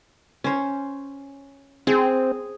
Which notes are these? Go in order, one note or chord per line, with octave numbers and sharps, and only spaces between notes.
C#4 C5
C4 G#4